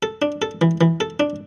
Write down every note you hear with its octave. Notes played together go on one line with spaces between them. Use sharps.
A4
D4
A4
E3
E3
A4
D4